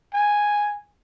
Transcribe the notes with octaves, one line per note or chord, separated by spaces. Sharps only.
G#5